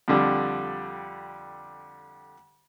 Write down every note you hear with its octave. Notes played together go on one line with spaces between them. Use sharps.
F2 D3 G3